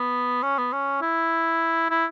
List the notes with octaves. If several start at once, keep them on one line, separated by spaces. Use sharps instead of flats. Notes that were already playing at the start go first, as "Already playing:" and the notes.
Already playing: B3
C#4
B3
C#4
E4
E4